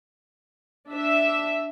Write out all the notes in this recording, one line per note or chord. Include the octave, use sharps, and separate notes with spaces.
D4 E5